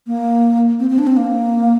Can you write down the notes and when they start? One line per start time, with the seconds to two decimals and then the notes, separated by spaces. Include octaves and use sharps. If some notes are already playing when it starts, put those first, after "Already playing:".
0.07 A#3
0.80 C4
0.90 C4
0.99 D4
1.07 C4
1.17 A#3